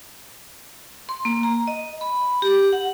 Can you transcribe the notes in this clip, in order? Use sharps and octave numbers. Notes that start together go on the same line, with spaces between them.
C6
A#3
A#5
D#5
B5
G4
F#5